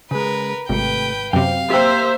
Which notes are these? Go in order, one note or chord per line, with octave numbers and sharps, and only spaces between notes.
C#3 G#3 A#4 B4
G#1 C3 A3 B4 G5
F#2 C3 F5 G5
A#3 G4 C5 E5 G5